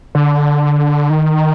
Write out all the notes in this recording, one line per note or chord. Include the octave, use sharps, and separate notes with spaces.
D3
D#3